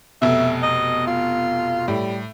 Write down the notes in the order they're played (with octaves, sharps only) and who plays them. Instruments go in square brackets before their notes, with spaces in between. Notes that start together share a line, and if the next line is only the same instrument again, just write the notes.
[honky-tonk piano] F1 B2 [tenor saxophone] E5
[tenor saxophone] D#5
F4
[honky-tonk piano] A2 [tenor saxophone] G3